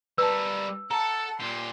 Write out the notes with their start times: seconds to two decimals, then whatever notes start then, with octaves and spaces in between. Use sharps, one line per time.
0.18 G3 A#4 B4 A5 E6
0.91 A4 F#5 A5 A#5
1.40 A#2 G4 C6